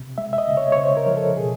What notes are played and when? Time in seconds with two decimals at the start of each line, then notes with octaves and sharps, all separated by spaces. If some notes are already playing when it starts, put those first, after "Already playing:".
Already playing: C3
0.18 G#3 E5
0.33 E5
0.38 D#5
0.48 C#3
0.57 C#5
0.72 C#5
0.77 C#3 C5
0.97 A#4
1.06 F3
1.17 A4
1.37 B2 G#4